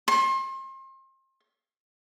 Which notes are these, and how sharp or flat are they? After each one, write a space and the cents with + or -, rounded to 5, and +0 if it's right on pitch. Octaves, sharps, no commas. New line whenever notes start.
C6 +35